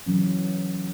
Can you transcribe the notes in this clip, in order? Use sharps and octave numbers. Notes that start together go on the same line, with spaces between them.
C#3 E3 F#3 C#4